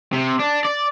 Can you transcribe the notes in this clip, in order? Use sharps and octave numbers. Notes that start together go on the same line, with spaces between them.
C3
D4
D5